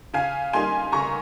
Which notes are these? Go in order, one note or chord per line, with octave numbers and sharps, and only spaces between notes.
C#3 F5 G#5
G3 A#3 D#4 G#5 C6
C#3 A#5 C#6